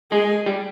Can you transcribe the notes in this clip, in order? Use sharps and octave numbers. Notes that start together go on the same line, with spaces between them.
G#3 G#4
G3